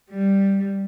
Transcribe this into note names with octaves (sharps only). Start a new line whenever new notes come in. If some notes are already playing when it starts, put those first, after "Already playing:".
G3